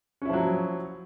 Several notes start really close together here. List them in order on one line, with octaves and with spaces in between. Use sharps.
C#4 E4 F3 F#3